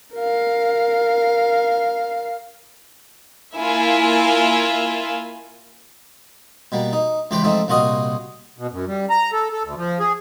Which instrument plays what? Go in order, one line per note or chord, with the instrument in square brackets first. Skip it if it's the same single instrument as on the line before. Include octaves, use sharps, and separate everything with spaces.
[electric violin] A#4 F5
[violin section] A#3 E4 F4 E5 G#5
[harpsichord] B2 G3 A#3
D#4
C#2 E3 G4 B4 C5 G5
G#2 F3 A3 C4 D#4
C2 A#2 F4 F#4 D#5 D#6
[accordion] B2
F#2
G3
A#5
A4
A4
D2
F3
G#4